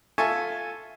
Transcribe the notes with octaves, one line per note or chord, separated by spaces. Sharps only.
F4 A4 E5 G#5 A5 C#6